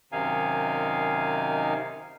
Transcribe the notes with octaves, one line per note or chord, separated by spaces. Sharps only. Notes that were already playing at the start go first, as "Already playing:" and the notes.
F#2 C3 D#3 D#4 F5 G#5